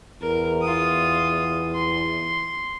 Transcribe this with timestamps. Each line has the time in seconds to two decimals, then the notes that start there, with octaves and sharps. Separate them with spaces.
0.21 E2 A#4
0.62 F4 D#6
1.74 C6